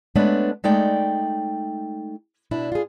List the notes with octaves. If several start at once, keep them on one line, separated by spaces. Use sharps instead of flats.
G#3 A3 B3 D4 B4 C#5
G#3 A3 D#4 D5 G5
B2 D4 E4
F4 G#4